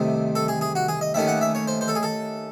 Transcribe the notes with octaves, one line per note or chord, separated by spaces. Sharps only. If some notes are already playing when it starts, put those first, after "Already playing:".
Already playing: C2 C3 D#3 A3 C4
A4
G#4
G#4
F#4
G#4
D#5
D#2 D#3 A3 C#4 E5
F#5
E5
C#5
C5
C5
A4
G#4
A4